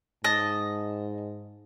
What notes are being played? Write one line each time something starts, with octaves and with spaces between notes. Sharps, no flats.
G#2 D#5 A5